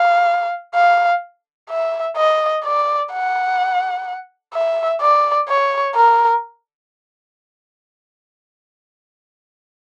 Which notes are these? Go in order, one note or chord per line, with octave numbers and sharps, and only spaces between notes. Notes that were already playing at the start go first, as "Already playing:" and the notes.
Already playing: F5
F5
E5
D#5
D5
F#5
E5
D5
C#5
A#4